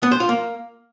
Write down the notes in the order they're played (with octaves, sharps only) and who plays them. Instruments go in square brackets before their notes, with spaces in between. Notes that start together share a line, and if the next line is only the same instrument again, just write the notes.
[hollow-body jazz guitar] B3
C5
F4
A#3